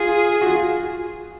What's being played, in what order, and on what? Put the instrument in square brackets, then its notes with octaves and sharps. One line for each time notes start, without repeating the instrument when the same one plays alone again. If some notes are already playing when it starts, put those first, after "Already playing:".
Already playing: [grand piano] F4 [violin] G#4
[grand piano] F#4
F4